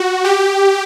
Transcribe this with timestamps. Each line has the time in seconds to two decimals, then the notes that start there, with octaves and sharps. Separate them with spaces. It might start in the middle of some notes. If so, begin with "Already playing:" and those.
Already playing: F#4
0.24 G4